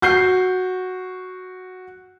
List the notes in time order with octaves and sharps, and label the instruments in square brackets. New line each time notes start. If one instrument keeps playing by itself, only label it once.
[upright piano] F#4 G6 C7